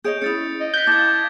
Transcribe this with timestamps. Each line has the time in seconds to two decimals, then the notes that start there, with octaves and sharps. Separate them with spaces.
0.04 G#4 C#5 D#5 G6 D7
0.22 C#4 E4 D#6 A6 C#7
0.60 D#5
0.74 F#6 G6 A#6 B6
0.87 E4 F5 A5 D6 G#6